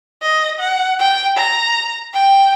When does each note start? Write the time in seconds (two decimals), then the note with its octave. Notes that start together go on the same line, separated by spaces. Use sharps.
0.22 D#5
0.60 F#5
0.99 G5
1.37 A#5
2.14 G5